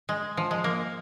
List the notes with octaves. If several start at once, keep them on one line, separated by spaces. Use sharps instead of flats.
G#3
F3
G#3
A#3